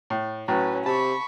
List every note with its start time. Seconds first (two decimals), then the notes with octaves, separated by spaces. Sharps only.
0.10 A2
0.48 A2 F#3 C#4 B4
0.86 C3 A5 B5 C#6